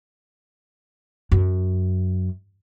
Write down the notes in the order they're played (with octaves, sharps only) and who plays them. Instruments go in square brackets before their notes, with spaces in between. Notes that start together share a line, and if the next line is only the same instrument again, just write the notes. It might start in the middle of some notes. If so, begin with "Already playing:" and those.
[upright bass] F#2